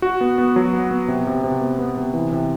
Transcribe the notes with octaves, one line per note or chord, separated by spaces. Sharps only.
F#4
B3
B3
F#3
B3
B3
C3
C3
C3
B3
B3
C3
E3
C3